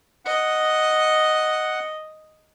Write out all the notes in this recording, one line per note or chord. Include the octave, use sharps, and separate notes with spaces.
D#5 F#5